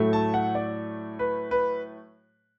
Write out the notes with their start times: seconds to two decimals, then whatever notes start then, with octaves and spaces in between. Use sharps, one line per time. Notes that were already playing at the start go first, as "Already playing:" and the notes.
Already playing: A2 F#3 A3
0.13 A5
0.34 F#5
0.55 D5
1.19 B4
1.51 B4